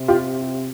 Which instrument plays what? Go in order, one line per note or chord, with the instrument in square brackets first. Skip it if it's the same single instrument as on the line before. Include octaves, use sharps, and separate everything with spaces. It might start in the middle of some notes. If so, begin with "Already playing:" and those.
Already playing: [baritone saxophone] C3
[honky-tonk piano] F4 G4